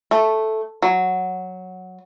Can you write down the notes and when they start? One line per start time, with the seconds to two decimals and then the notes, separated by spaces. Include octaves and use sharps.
0.11 A3
0.82 F#3